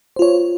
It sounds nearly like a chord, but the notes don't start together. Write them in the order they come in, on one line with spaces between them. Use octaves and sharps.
C5 F4 C#5